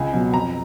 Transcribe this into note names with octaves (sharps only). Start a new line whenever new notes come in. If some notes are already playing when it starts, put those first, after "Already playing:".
Already playing: C#2 G#5
B2 F#3
F2 A#5